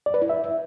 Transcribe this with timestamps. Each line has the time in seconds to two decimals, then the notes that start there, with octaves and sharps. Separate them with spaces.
0.06 D5
0.14 B4
0.22 E4
0.29 E5